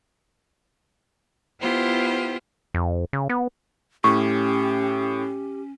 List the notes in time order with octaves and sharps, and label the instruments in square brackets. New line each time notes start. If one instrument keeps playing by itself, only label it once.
[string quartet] B3 E4 F4 G4 C5
[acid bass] F2
C#3
B3
[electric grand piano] A2 [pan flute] C#4 [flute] G4 [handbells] C#6